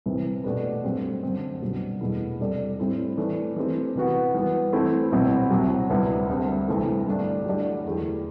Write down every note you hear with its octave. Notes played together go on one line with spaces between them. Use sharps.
C2 C3 E3
B2 A3 D4 G4 B4
G2 F#3 A3 C4 G4
F#2 D3 A3 C4
C2 B2 G3 D4 F#4
E2 B2 F#3 A3 E4
C3 G3 D4 A4 D5
A2 G3 C4 E4 A4
E3 A3 D4
E3 A3 C4 G4
C3 E3 B3 F#4
E3 G3 B3
E3 A3 C4 E4
C2 B2 F#3 C4 E4
C2 C3 F#3
D2 C3 G3 B3 E4
D2 D3 G3 C4
C2 C3 E3 A3 E4
G2 D3 A3 D4
F#3 A3 E4 G4 D5
E2 D3 A3 E4 G4